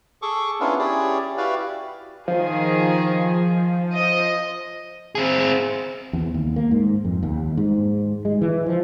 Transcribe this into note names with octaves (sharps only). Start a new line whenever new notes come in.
G#4 A4 C#6 D6
B3 C#4 D4 E4 F4 A#4
C#4 E4 G4 G#4 C#5 D5
E4 F#4 G4 B4 D5 F5
D#3 F3 G#4
D#5
C4 G#4
E2
D#2
A#3
G#2
F2
D#2
G#2
G#3
E3
F3